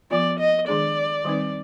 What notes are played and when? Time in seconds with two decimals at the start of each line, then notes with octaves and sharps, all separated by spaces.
0.11 F3 B3 F4 D5
0.39 D#5
0.68 D#3 G#3 D4 G#4 D5
1.24 D#3 G3 C4 D#4 B4